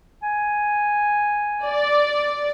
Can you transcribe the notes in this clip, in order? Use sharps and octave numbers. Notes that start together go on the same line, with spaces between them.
G#5
D5